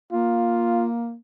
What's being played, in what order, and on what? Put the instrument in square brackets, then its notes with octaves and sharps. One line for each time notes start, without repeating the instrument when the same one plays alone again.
[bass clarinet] A#3 [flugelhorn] F4